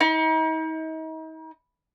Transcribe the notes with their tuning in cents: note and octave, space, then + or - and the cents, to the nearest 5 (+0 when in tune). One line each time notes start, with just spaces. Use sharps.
D#4 +40